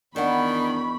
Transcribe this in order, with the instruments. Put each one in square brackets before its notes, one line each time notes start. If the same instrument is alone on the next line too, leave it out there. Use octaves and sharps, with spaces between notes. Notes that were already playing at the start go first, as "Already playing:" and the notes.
[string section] E2 B5 [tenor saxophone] D#3 [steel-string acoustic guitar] D4 F#5 [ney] C#6